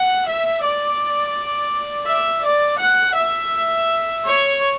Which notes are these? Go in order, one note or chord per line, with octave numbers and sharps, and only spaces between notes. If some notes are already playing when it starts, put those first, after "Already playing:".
Already playing: F#5
E5
D5
E5
D5
F#5
E5
C#5